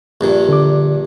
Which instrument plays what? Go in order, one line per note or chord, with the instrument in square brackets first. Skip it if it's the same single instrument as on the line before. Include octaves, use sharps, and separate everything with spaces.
[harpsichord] A#1 G2 A#2
[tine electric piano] D3 D6